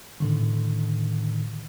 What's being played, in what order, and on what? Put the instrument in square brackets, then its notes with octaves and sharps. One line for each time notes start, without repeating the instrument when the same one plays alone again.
[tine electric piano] A2 D3 D#3